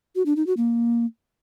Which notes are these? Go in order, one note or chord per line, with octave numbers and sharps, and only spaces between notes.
F#4
D4
D#4
F#4
A#3